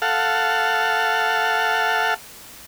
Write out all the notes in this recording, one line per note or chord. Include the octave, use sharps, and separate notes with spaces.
A4 F5 F#5